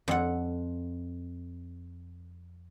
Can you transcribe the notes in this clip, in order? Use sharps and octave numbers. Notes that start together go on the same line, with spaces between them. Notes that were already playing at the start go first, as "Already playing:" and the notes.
F2 F#5